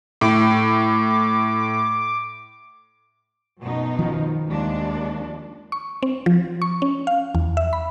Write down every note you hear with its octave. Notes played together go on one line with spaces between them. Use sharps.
A2 D6
F#2 B2 D#4
D#3 F3
D#2 G#3 D4
C#6
C4
F3
C#6
C#4
F5
E2
E5
B5